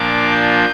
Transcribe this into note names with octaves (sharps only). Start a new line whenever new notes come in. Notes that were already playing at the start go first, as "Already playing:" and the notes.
Already playing: A#2 F3 A#3 D4 D6
G6